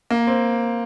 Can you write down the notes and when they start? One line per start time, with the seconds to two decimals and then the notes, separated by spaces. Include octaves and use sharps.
0.11 A#3
0.27 C4